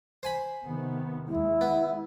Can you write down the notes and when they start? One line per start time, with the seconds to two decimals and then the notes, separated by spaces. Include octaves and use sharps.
0.23 C5 G#5 B5
0.64 C3 D#3 B3
1.28 D#2 G#3 E4
1.61 B3